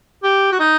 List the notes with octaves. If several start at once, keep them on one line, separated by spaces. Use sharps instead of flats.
G4
F#4
D#4